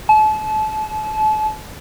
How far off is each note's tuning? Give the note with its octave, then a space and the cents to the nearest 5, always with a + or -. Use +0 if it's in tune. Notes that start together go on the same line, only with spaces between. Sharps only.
A5 -35